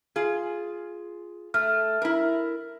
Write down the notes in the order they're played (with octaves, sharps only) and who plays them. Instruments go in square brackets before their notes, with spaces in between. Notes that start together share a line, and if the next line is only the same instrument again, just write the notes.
[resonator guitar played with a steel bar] F4 G#4
[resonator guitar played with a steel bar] A3 [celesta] F6
[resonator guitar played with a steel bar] E4 A#4